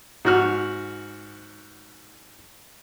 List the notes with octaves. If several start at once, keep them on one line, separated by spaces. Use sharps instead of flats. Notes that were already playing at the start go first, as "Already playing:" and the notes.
G#2 F#4 F6